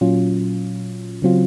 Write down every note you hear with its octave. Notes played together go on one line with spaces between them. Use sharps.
A#2 F#3 C#4 F4
C#3 F#3 C4 F4